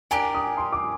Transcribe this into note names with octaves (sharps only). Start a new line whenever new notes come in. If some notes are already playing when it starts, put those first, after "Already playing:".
D4 G4 A#4 D5 G#5
D#6
C6
D6